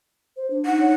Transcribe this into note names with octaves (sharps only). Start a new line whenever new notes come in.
C5
D4
D#4 F#5
C#5